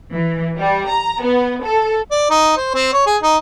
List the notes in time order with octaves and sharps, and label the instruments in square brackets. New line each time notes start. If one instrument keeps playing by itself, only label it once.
[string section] E3
G3
A#5
B3
A4
[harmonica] D5
D#4
C5
C4
C#5
G#4
D#4